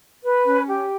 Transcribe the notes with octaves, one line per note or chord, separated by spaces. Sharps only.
B4
C#4
G4